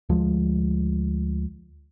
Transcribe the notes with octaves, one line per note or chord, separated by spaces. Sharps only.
D2 F3 G#3